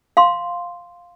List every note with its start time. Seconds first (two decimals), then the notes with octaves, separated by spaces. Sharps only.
0.17 F5 C6